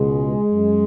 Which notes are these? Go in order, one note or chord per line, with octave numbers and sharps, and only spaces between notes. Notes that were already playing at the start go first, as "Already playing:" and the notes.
Already playing: C#2 B2 G#3
F#2